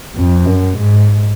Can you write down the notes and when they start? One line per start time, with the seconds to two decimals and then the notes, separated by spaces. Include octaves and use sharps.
0.16 F2
0.47 F#2
0.78 G#2